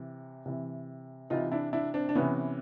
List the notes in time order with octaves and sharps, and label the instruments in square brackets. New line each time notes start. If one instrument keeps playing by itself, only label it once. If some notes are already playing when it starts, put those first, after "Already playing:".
Already playing: [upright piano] C3 E3
C3 E3
C3 E3 D#4 F4
D4 E4
D4 E4
C4 D4
D4
C3 E3 B3 C#4